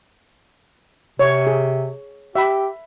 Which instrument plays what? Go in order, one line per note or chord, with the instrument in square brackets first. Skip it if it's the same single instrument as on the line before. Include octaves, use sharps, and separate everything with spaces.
[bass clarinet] C3 [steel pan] C#5
[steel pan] G#4
[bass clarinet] G4 [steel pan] E5 B5